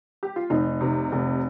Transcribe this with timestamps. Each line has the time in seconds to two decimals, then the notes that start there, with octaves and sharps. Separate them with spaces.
0.23 G4
0.36 F4
0.50 F1 D#4
0.81 C3
1.12 F1